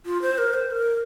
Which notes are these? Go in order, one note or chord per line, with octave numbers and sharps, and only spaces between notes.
F4
C5
A#4
C5
A#4